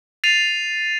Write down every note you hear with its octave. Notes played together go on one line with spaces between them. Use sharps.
A6 C7 D#7 F7